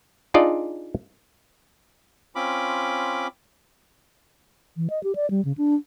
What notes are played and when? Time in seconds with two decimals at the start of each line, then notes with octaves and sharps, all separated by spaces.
0.34 D4 D#4 F4 G#4 D5 D#5
2.35 C4 C#4 F4 B5 D6
4.77 E3
4.90 D#5
5.03 G4
5.15 D5
5.30 G3
5.45 C#3
5.58 D4